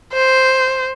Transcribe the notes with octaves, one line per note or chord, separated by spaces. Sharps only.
C5